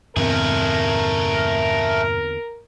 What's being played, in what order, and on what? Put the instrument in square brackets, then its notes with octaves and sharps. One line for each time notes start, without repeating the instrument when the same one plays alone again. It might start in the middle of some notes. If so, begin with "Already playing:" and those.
[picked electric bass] E2 D3 C4 [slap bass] G2 A#2 [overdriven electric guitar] A3 G#4 [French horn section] A#4